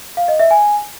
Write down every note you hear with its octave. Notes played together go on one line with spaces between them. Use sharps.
F5
D#5
E5
G#5